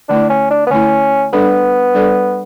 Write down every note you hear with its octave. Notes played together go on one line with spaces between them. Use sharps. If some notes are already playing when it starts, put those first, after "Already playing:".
D3 A3 D4 E4
C#4
D4
B3
D3 A3 C#4 E4
G3 B3 D4 A4 D5
G3 D4 A4 D5